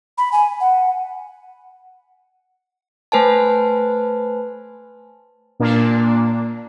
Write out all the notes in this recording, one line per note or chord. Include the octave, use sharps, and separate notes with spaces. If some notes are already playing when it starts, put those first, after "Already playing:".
B5
G#5
F#5
A3 B4 C5 G#5 A5
A#2 A#3 D4